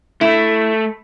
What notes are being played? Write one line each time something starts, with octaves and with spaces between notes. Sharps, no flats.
A3 E4